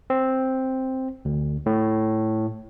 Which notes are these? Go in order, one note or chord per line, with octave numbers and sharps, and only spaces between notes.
C4
D2
A2